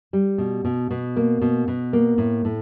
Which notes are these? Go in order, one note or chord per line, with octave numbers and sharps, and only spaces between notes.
G3
B2
B2
B2
A#3
B2
B2
A#3
A2
A2